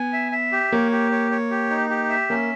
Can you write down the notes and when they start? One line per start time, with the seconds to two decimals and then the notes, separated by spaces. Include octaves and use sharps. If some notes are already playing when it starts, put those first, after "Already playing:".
Already playing: B3 G#5
0.13 E5
0.32 E5
0.52 G4
0.72 A#3 C#5
0.92 G4
1.11 C#5
1.31 C#5
1.51 G4
1.70 D#4
1.90 G4
2.10 E5
2.30 A#3 C#4